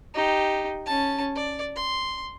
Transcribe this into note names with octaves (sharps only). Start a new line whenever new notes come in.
D#4 G4
C#4 A5
D5
C6